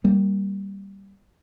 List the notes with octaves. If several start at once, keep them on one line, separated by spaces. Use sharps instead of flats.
G3 A#3